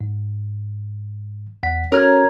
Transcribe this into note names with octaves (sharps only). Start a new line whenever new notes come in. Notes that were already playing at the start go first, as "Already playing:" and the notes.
G#2
E2 F#5 B6
C#4 F#4 A4 A#4 C#5 F6